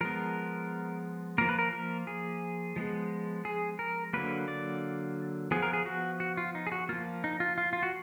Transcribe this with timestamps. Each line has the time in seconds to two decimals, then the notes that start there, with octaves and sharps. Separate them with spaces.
0.01 F3 G#3 B3 A#4
1.38 F3 A#3 A#4
1.49 B4
1.59 A#4
1.73 A#4
2.07 G#4
2.76 F3 G#3 B3
3.45 G#4
3.79 A#4
4.13 D3 F#3 A#3 B4
4.48 D5
5.51 F3 B3 G#4
5.62 A#4
5.73 G#4
5.86 F#4
6.20 F#4
6.37 F4
6.55 D#4
6.67 G#4
6.72 F#4
6.89 F3 A#3 F4
7.24 D#4
7.40 F4
7.58 F4
7.73 F4
7.83 F#4